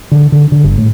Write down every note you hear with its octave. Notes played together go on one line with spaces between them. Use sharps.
D3
D3
D3
G1
A2